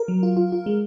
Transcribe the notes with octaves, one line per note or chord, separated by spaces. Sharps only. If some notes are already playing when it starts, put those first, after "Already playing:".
Already playing: A#4
F#3
F4
F4
F4
G#3